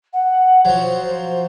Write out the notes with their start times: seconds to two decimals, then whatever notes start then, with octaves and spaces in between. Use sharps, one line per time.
0.13 F#5
0.65 F3 F#3 C5